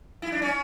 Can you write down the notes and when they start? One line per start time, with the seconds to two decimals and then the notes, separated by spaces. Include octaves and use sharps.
0.22 E4
0.32 D4
0.42 C#4